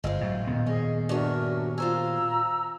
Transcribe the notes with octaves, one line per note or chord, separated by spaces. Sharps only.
G1 G#3 F4 C5
A2 F#3
A#2 D#3 B3
C#4 G#4 D#5
G2 C#4 D4 F#4 A#4 E5
F4 C5 G#5 A#5 E6